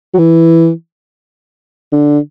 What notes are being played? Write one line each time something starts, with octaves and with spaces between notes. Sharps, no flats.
F#3
E3
D3